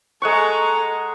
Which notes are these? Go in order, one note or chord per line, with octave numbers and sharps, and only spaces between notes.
G#3 A4 F#5 A#5 C#6